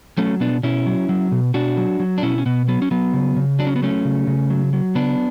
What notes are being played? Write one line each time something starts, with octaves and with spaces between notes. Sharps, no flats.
F#3 A3 C#4
B2 B3 D4
B2 C#4 E4
F#3
F#3
B2
B2 D4 F#4
F#3
F#3
D4
B2 C#4 E4
C#4
B2 B3
F#3 B3
C#4
F#3 B3
C#3
C#3
F#3 D4
C#4
B3
F#3 A3 C#4
C#3
C#3
F#3
F#3
C#3 B3 D4